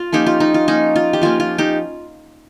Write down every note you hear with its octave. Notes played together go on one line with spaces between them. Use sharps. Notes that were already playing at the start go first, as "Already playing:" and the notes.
Already playing: F4
F3 A#3 C#4 D#4 G4
F4
D#4
F4
F3 A#3 C#4 D#4
F4
G4
F3 A#3 C#4 F4
F4
D#4 G4